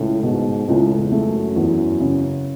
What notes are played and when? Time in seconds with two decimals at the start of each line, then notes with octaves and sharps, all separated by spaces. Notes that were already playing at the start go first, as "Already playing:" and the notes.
Already playing: C#2 A2
0.23 G#2 B2
0.68 C#2 A2
0.98 E2
1.12 A3
1.28 F#2
1.56 E2
2.01 C#3